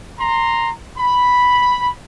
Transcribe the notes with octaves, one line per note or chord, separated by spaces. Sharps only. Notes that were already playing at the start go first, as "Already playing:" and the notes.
A#5 C6
B5